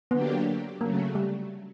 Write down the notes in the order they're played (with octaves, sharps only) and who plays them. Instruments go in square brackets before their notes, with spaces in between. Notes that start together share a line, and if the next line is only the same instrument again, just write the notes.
[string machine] D3 F#3 A#3 D4 G4 [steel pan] B3
[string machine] C#3 F#3 A3 [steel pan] A#3
[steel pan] G3